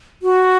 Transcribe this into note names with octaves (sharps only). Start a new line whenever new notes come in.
F#4